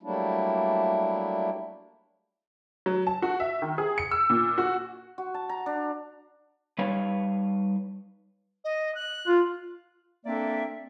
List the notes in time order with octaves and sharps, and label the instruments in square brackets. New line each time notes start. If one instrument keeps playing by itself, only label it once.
[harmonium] F#3 G3 A3 A#3 D4 E4
[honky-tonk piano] F#3
A5
F#4
E5
D#3
G#4
C#7
E6
A#2
F#4
[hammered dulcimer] F#4
A5
A#5
D4
[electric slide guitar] G3 D#4 B4 C#5 F5
[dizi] D#5
F#6
[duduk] F4
[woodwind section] A#3 C4 D4 A4 D5 E5